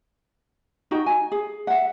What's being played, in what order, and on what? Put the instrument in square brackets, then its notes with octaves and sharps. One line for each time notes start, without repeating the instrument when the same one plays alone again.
[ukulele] D#4 F#4 G5
G#5
G#4
E5 F#5